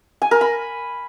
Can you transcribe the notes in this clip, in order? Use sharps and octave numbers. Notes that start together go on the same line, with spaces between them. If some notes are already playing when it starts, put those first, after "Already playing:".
G#5
A#4
B5